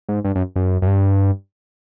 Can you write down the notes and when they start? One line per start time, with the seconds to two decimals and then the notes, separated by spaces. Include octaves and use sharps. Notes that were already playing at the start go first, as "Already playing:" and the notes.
0.08 G#2
0.24 G2
0.35 F#2
0.56 F#2
0.82 F#2
0.87 G2